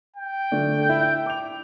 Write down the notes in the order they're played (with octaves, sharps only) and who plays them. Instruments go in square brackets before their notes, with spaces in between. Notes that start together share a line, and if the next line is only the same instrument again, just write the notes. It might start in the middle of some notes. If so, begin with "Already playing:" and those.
[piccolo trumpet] G5
[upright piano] D3 A3 D4
E4
D6 F7